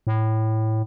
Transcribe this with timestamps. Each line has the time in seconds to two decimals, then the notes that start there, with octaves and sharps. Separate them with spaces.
0.07 A2